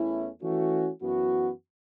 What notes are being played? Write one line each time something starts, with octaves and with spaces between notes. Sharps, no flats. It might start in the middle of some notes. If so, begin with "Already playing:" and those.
Already playing: E2 E3 A3 C#4 E4
E3 A3 C#4 F#4
F#2 E3 B3 F#4